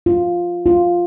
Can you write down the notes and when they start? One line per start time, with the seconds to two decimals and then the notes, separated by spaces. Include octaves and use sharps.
0.06 F4
0.66 F4